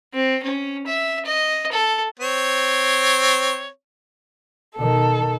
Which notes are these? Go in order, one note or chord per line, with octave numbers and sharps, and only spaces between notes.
C4
C#4
E5
D#5
A4
C4 C#5
B2 D#3 A4